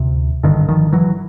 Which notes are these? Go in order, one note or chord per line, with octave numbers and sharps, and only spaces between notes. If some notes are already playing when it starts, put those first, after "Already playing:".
Already playing: D2 C3
G#1 G2 D3 D#3
D#3 F3
E3 F#3